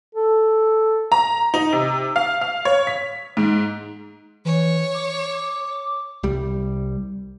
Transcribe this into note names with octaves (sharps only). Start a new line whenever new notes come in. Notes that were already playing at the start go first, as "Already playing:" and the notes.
A4
A#5
D#4
C3
F5
F5
C#5
B6
G#2
E3 C#5
D6
C2 G3